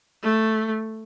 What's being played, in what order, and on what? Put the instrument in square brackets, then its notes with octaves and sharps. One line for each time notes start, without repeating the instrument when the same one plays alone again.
[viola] A3